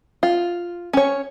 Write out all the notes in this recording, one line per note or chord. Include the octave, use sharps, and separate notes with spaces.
F4
C#4 C#5